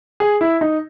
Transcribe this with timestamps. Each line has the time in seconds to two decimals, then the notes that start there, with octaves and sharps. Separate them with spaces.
0.20 G#4
0.41 E4
0.61 D#4